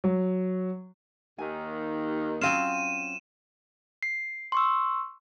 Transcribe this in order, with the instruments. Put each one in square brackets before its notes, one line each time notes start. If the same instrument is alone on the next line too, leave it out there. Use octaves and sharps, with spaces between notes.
[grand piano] F#3
[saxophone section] D#2 D#3 [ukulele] G#5
[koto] F#3 C4 F4 [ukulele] C#4 F5 G5 [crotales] D#7 E7
[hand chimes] C7
C6 C#6 E6